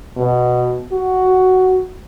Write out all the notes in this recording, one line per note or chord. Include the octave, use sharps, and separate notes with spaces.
B2
F#4